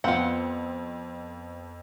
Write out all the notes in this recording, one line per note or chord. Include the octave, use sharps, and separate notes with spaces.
F2 B3 C4 F4 F5 F#5